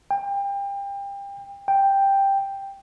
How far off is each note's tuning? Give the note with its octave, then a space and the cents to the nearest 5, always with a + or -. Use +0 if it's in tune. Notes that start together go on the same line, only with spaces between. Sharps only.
G5 +30
G5 +5